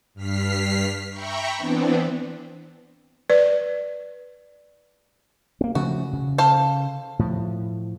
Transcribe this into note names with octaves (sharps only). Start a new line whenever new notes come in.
G2 F6 B6 C7
E5 G5 A#5 B5 C#6
E3 B3 C4 D4
B4 D5
A#3 C4
C#3 F3 A3 F#4
C#3
A4 C5 F5
A2 F3